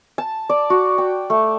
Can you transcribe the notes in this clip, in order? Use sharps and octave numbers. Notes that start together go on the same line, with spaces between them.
A5
D5
F#4
G5
A3